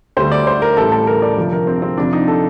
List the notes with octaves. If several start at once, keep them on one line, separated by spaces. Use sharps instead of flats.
D2 D3 G3 C5
D5
C5
A#4
A1 A2 G3 A4
A4
A#4
D5
G1 F2 C3 F3
A#4
C4
C4
F2 C3 F3 D4
D#4
A4